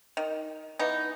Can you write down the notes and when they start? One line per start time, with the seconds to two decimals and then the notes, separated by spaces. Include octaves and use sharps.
0.17 D#3
0.79 E3 B3 D#4